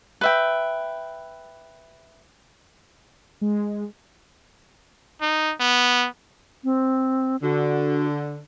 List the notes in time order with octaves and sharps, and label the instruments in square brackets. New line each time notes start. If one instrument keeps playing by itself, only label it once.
[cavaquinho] B4 E5 G5
[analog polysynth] G#3
[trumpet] D#4
B3
[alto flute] C4
[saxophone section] D3 [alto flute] F#4